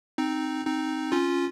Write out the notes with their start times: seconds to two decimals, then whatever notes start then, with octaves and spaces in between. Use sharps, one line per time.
0.18 C4 D#4
0.65 C4 D#4
1.12 C#4 F4